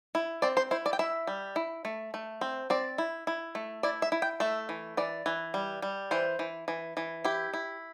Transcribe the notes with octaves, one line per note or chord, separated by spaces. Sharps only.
E4
C4 D5
C5
E4 C5
D5
G5
E4 E5
G3
E4
A3
A3
C4
C4 D5
E4
E4
A3
E4 D5
E5
E4
G5
A3 E5
E3
E3 D5
E3
G3
G3
E3 C5
E3
E3
E3
E4 G4
E4